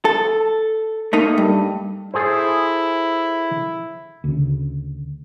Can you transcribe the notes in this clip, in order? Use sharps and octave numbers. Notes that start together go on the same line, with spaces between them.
A4
A3 A#3 D#4
G2
E4 G#4 A4 C5
D2 C#3